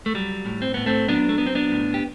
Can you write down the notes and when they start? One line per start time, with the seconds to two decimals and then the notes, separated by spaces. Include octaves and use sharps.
0.06 A3
0.14 F#3 G3
0.46 A2
0.62 C4
0.74 A2 B3
0.86 A3 C4
1.08 F#3 B3 D4
1.29 A3
1.38 F#3 B3
1.47 C4
1.55 B3 D4
1.71 A2
1.94 G4